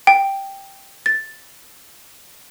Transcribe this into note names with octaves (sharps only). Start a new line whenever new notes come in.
G5
A6